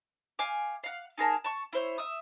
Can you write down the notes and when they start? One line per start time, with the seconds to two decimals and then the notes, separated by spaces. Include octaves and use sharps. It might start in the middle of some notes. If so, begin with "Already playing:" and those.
0.39 F5 G5 G#5 D6
0.84 F5 F#5
1.18 D#4 G#4 A#4 A5
1.44 A5 C#6
1.73 E4 C5 C#5
1.98 E5 D#6